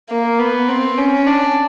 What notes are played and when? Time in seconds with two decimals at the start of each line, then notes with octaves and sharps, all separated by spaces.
0.09 A#3
0.39 B3
0.68 C4
0.97 C#4
1.27 D4